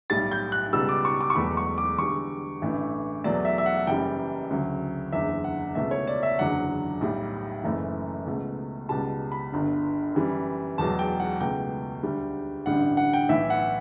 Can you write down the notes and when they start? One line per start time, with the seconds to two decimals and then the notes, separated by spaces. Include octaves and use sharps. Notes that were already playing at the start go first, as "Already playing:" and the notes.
0.10 B1 A2 G3 A6
0.32 G6
0.52 F#6
0.73 C#2 B2 G3 E6
0.89 D6
1.05 C#6
1.21 D6
1.30 C#6
1.36 E1 E2 B2 F#3 A3 B5
1.57 C#6
1.78 D6
1.98 E2 D3 G3 C#6
2.62 A1 G2 E3 A3
3.24 E2 B2 F#3 A3 D5
3.45 E5
3.58 E5
3.66 F#5
3.77 F#5
3.87 F#1 F#2 E3 G3 G5
4.50 D2 C#3 F#3
5.13 F#1 E2 D3 E5
5.44 F#5
5.75 C#2 B2 A3 E5
5.91 C#5
6.07 D5
6.23 E5
6.38 F#1 E2 D3 F#3 F#5
7.01 B1 A2 G3
7.64 F#1 F#2 E3 A3
8.26 C#2 B2 A3
8.89 C#2 B2 G3 A5
9.32 B5
9.52 G1 G2 D3
10.15 F#2 E3 G3
10.78 E1 E2 B2 F#3 A5
10.99 G5
11.20 F#5
11.41 C#2 B2 A3 G5
12.03 D2 D3 G3
12.66 A1 G2 D3 G3 F#5
12.97 F#5
13.13 G5
13.29 B1 A2 E3 E5
13.50 F#5